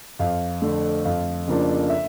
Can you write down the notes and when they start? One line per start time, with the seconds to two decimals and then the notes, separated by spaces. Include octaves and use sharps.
0.19 F2 F5
0.62 D3 A3
1.05 F2 F5
1.47 C#3 F3 A#3 D4
1.89 E5